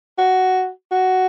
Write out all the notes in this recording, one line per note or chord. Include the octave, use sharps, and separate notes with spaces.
F#4
F#4